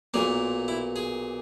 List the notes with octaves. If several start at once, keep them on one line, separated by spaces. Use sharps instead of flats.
B1 A#2 A#3 G#4
E4
G#4